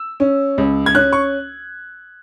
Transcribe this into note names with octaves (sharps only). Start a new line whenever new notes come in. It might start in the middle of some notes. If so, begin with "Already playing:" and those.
Already playing: E6
C#4
C#2
G#6
C#4 F#6
C#6